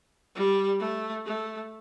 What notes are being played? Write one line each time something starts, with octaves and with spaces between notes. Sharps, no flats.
G3
A3
A3